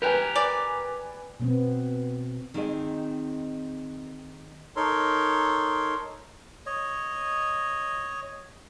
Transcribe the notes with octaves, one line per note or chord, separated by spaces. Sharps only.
G4 A#4 B4 G5 G#5
D5
B2 B3 C4
D#3 C4 D#4 G#4 D#5
D#4 A4 A#4 C#5 C6
C#5 D#5